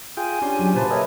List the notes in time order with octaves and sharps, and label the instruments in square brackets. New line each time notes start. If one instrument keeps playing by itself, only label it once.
[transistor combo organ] F4 G#4 G5 [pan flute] G#5
[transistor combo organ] C#4 D4 G4 [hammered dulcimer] C6
[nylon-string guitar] F#3
[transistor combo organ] A#2 C#3 [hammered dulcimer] F4 B4 A5 [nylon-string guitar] G4 [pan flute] C5
[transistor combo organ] G#4 A#4 D#5 [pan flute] C#5 [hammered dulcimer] E5